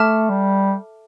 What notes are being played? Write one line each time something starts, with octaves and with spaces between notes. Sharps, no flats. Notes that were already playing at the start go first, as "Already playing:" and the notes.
Already playing: A3 A4 E5 A5 D6 F6
G3